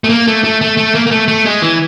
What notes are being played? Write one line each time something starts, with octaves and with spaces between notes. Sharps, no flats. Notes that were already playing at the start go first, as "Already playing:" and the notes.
A3
A#3
A3
A3
A3
A3
A#3
A#3
A3
A3
G#3
E3